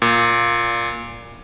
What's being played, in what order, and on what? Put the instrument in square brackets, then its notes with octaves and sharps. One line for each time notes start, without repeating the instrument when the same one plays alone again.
[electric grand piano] A#2